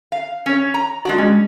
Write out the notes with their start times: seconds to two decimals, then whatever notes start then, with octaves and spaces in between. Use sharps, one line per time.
0.12 F5
0.46 C#4 C#5
0.74 A#5
1.05 G#3 D4 F#4 D5
1.18 G#3 C#4